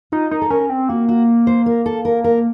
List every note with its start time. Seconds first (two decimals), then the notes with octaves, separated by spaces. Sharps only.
0.12 D#4 F4
0.31 D#4 A#4
0.42 A4
0.50 C#4 A#4
0.70 C4
0.89 A#3 F#4
1.09 F#4
1.47 C5
1.66 A#4
1.86 A4
2.05 A#4
2.24 A#4